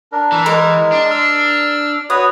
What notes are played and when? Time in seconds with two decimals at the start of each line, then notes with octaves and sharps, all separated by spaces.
0.12 D4 A#4
0.32 E3
0.46 G#3 A#4
0.92 D4
1.11 E6 F6
2.10 F#4 B4 C#5 D#6